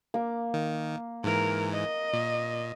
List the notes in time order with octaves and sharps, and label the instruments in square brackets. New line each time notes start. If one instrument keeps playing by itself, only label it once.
[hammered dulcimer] A#3 D6
[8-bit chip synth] D#3
[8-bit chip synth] G#2 E3 [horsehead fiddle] A#4
[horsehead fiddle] D#5
[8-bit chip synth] A#2